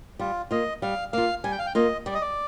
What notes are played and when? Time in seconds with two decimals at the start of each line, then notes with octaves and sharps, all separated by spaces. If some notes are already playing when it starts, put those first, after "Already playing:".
0.19 G3 F4
0.51 A#3 F4 D#5
0.82 G3 F5
1.13 A#3 F4 F5
1.44 G3 G#5
1.52 G5
1.59 F5
1.66 G5
1.75 A#3 F4 D#5
2.06 G3 D5
2.14 D#5
2.21 D5